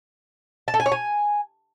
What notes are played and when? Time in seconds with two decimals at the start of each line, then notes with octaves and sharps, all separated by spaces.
0.68 A5
0.74 A4
0.80 G#5
0.86 C#5
0.92 G#5